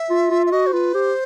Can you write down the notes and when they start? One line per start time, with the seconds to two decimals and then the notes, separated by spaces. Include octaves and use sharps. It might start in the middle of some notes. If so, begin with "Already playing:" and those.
Already playing: E5
0.10 F4
0.31 F4
0.46 E5
0.52 F#4 D#5
0.67 C5
0.73 F4 B4
0.94 G4 C5